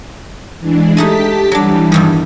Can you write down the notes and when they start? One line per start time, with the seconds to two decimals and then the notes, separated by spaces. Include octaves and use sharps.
0.60 E3 G#3 D4
0.97 G#3 A3 D#4 G4 A5 B6
1.52 E3 F#3 G3 D4
1.92 E2 G2 D#3